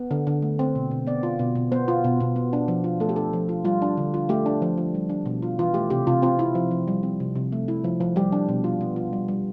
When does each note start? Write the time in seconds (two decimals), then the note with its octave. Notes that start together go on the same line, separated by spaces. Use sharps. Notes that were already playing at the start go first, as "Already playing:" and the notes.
Already playing: B3
0.11 D3
0.27 D3
0.42 A3
0.59 C4
0.75 B2
0.91 B2
1.07 B3 D5
1.23 F4
1.39 B2
1.55 B2
1.72 B3 C5
1.88 F4
2.04 B2
2.20 B2
2.36 B3
2.53 D4
2.68 F3
2.84 F4
3.00 A3 A4
3.09 G4
3.16 D4 A4
3.33 F3
3.49 F4
3.64 G3 F4
3.82 D4
3.97 D3
4.14 F4
4.29 A3 G4
4.46 D4
4.62 F3
4.78 F3
4.95 G3
5.10 D4
5.26 B2
5.42 F4
5.59 E3 F4
5.74 A3 G4
5.90 C3 G4
6.07 C3 F4
6.22 C4 F4
6.39 E4
6.55 F3
6.71 F3
6.88 G3
7.03 C4
7.20 C3
7.35 C3
7.52 A3
7.68 E4
7.84 F3
8.01 F3
8.16 G3 G4
8.32 D4
8.49 B2
8.64 F4
8.81 B3
8.96 F4
9.13 G3
9.28 G3